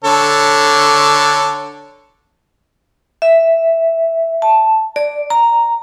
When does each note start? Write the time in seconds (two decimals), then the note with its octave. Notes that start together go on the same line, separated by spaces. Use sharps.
0.04 D3 A4 C#5
3.22 E5
4.42 A5
4.96 D5
5.30 A#5